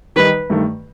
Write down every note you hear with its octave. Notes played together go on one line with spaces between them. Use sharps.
D#3 G3 D#4 B4
G2 D#3 A3